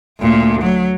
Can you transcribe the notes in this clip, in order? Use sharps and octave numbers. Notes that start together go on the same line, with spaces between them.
D2 A#2
F#3